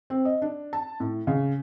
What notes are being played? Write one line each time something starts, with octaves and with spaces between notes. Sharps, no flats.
C4
D#5
D4
A5
A2
C#3